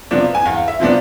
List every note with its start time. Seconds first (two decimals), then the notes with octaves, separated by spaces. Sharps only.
0.11 C3 F3 B3 D4
0.35 G#5
0.45 E2 F5
0.68 E5
0.80 C3 F3 B3 D4